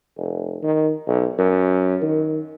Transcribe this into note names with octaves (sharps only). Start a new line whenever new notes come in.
F1
D#3
B1
F#2
D#3